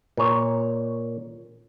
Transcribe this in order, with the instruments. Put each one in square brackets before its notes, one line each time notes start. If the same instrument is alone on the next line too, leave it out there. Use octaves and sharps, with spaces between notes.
[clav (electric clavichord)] A#2 C#5